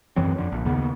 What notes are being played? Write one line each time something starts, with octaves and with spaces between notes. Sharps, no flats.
F#2 E3 F#3 C4
F2 D3
A#1
D#2 C#3 B3